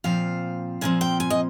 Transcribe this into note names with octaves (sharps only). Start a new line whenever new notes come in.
A#2 F3 C4 F5
A#2 F3 C4 G#5
G5
G#5
D#5